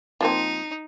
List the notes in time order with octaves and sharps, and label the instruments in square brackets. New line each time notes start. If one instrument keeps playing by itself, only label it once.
[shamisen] F3 A#3 C4 [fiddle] D#4